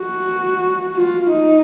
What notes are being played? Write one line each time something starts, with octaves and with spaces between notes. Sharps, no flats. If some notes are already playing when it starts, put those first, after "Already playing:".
Already playing: F#4
F4
D#4